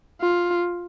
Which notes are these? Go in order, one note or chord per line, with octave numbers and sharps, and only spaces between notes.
F4